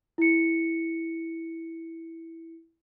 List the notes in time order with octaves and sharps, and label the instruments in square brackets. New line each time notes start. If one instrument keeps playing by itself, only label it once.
[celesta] E4 C#7